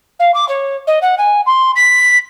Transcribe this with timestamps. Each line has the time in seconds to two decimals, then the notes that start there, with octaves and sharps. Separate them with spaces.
0.19 F5
0.34 D6
0.48 C#5
0.87 D#5
1.01 F#5
1.18 G#5
1.46 C6
1.75 B6